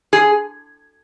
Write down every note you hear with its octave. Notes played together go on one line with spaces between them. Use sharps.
G#4